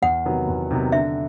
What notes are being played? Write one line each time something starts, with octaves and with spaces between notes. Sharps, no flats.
E2 F#5
C3 D#3 F#3 B3
E2
C3 D#3 F#3 B3
D3 E5